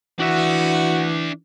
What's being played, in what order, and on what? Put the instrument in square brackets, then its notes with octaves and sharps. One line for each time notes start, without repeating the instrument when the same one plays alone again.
[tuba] E3 [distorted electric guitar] D4 E5 [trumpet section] F#4